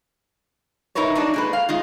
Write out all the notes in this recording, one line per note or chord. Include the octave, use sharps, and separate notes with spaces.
D#4 E4 A#4 B4 C#5
F#3 G3 D4 D#4
A#2 G#3 B4
F5
G#3 D#4 F4